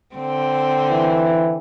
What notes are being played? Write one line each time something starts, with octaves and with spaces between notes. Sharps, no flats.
D3 C4
E3